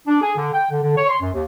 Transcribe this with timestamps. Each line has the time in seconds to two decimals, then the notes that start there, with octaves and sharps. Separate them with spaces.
0.07 D4
0.21 G#4
0.37 D3
0.53 G5
0.70 D3
0.81 D3
0.96 C#5
1.09 C6
1.21 F#2
1.33 D#2